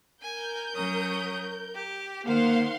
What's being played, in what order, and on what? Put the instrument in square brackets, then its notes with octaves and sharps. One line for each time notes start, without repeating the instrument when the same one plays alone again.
[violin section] A#4 G6 [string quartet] G#5
[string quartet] F#3 C#4 D#6
G4
[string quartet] D#3 C5 [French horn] A#3 [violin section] F5 F#5 C6